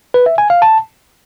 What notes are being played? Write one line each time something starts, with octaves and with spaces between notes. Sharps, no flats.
B4
E5
G#5
F5
A5